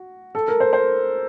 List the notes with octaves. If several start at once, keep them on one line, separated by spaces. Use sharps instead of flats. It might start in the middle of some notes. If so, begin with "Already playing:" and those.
Already playing: F#4
A4
A#4
C5
C5